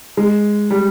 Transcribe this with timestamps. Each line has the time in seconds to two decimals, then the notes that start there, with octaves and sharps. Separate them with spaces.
0.17 G#3
0.71 G3